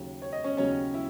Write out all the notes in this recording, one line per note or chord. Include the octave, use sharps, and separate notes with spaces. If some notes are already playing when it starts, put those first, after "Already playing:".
Already playing: D#2 C#3 F#3
C#5
D#5
C#4 C#5
D#2 C#3 F#3 C#4 C#5
E4 E5